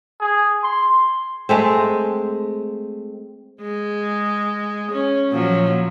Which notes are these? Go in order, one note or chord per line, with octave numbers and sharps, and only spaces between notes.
G#4
C6
G#3 A3 C4
G#3
C#4
A#2 F3 F#3